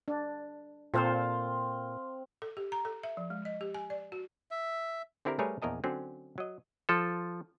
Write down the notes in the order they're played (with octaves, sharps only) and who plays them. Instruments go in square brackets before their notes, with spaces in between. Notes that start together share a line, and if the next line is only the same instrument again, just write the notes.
[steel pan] D4
[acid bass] A#2 [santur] C4 F5 C6 [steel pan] F4 A4 C5
[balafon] A4
G4
A#5
A4
E5
F3
G#3
D#5
G4
G#5
D5
F#4
[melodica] E5
[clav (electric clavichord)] D3 C4 E4 G4 A#4
G3 A3 G#4 A#4 B4 C#5
A#1 E2 A#4 D#5 A5
D3 F#3 C4 C#4
F#3 D#5
F3 A4